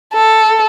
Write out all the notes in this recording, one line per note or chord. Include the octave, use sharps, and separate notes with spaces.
A4